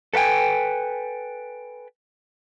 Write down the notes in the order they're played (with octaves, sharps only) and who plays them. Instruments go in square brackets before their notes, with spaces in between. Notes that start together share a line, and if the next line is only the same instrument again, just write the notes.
[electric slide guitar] A4 B4 F5 G5 G#5